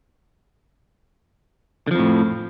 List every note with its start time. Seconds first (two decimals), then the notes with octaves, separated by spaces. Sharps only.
1.87 D3
1.91 F3
1.95 F2
1.99 A2